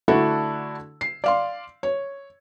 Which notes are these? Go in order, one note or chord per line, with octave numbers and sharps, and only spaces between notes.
D3 A3 D4 E4 F#4 A4
C7
D5 F5 C6
C#5